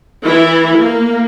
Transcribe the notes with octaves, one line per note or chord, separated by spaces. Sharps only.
E3 E4
A#3